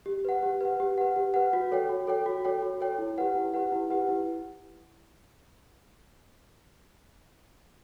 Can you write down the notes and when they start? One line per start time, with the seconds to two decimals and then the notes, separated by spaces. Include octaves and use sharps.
0.06 G4
0.25 B4 F#5
0.43 G4
0.61 B4 F#5
0.80 G4
0.98 B4 F#5
1.16 G4
1.34 B4 F#5
1.53 F#4
1.72 A4 C#5 G5
1.89 F#4
2.07 A4 C#5 G5
2.26 F#4
2.45 A4 C#5 G5
2.63 F#4
2.81 A4 C#5 G5
2.99 E4
3.18 G4 B4 F#5
3.35 E4
3.54 G4 B4 F#5
3.72 E4
3.90 G4 B4 F#5
4.09 E4